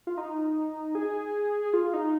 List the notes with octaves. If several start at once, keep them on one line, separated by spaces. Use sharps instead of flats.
F4
D#4
G#4
F4
D#4